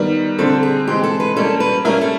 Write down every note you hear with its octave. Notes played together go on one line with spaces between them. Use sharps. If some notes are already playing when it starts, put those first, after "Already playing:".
Already playing: D#3 G3 B3
D3 G3 C4 A4
G#4
E3 G#3 C4 G4
A4
B4
G3 A#3 C#4 A4
B4
G3 A#3 C#4 E4 A#4
A4